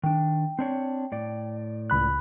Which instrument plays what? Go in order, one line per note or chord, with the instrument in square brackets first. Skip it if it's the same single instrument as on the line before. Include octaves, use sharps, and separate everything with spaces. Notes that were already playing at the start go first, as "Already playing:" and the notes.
[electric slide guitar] D#3 D4 [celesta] G5
[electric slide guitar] C4 D4 C#5
A2 D5
[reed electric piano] C#2 B5 F#6